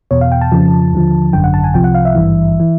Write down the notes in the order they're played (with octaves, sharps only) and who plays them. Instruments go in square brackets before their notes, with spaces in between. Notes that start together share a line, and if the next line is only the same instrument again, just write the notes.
[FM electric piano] E2 B2 C#5
F5
G5
A5
F2 C#3 F3
D#2 D3 F3
G#1 F#2 D3 G5
F#5
A5
G#5
C2 C3 F3 G5
F#5
F5
E5
G#1 G2 E3
E3